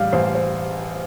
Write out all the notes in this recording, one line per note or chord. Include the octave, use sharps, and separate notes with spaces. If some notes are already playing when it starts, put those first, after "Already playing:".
Already playing: A1 G3 F5
A1 C5
C5